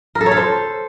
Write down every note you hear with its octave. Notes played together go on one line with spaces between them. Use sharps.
A#4
A4
C#5
A4
C5